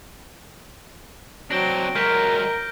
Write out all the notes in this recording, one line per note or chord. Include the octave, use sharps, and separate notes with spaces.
F#3 C4 D4 A#6 D7 G7
F#3 G#3 A#4 F6 G6 B6